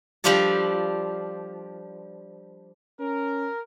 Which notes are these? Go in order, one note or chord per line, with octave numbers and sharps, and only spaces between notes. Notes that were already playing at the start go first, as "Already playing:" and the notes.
F3 G3 D4 F4 G4 A4
C#4 A#4